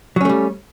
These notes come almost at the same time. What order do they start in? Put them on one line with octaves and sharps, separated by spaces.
F#3 C#4 A3 G3